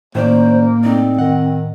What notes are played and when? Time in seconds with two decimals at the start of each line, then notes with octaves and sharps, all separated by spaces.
0.15 A2 D#3 A#3 C#4 C5 D5
0.83 A3 C4 D#4 D5
1.18 D#3 D#5 F#5